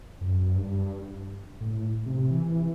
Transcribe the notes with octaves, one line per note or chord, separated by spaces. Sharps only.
F#2
G2
A2
C3
E3